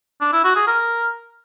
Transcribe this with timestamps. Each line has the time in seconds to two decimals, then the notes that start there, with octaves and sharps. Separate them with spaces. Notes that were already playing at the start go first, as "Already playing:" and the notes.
0.21 D4
0.32 E4
0.44 F#4
0.55 G#4
0.67 A#4